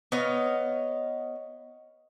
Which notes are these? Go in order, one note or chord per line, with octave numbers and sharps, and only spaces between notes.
B3 C#5 D#5 F5